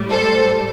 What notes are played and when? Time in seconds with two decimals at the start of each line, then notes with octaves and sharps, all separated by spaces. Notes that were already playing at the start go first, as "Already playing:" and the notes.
Already playing: A2 G3
0.10 A4 C5